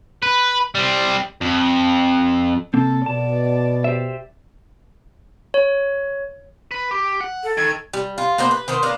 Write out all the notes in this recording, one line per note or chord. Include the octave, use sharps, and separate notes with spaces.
B4
G3 C4
F2
C3 A#3 C4 A4
B2 D5 A5
G4 C5 E5
C#5
B4
G4
F#5
A4
D#3 G#6
G3
F4
A#3 B3 D4 C5
B4
D#3 B3 C5
A#3 B3 D4 A#4